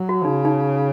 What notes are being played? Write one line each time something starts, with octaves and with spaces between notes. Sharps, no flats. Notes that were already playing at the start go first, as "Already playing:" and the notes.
Already playing: F#3
F#4
C#3 D#4
D#4